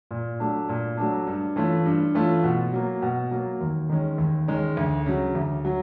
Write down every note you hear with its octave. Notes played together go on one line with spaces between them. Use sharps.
A#2
F#3 A3 D4
A#2
F#3 A3 D4
G2
E3 A3 C#4 F4
G2
E3 A3 C#4 F4
B2
F#3 A#3
B2
F#3 A#3
D#2
D#3 G#3 C#4
D#2
D#3 G#3 C#4
D2
C#3 F#3
D2
F#3